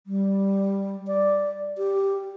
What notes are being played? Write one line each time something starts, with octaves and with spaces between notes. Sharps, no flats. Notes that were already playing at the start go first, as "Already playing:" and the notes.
G3
D5
G4